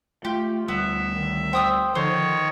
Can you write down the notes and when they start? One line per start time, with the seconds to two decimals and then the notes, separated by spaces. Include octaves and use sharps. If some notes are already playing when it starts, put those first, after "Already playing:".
0.25 A3 F4 G4
0.68 D2 G3 B3 E5
1.12 D#3
1.53 C5 G5 D#6 E6
1.95 D3 D#3 F3 C5 C#5